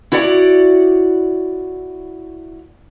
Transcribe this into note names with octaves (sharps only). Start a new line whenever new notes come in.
E4 F#4 C#5 D5 F#5